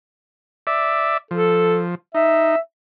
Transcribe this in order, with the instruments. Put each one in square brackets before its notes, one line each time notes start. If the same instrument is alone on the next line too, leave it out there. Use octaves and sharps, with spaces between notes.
[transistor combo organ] D5 E5
[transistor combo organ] F3 [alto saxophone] A4
[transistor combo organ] D#4 [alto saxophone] E5